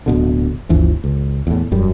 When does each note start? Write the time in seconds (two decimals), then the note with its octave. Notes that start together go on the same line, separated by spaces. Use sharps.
0.06 D1 B2 D3
0.69 G1 D2 E3 F3
1.04 C#2
1.47 E2 A2
1.71 E1 F#2 G3